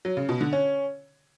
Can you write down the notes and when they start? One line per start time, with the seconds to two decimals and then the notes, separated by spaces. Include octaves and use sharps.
0.05 F#3
0.17 C#3
0.29 B2
0.41 D3
0.53 C#4